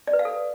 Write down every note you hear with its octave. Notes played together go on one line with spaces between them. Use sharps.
D5
B4
F5
A4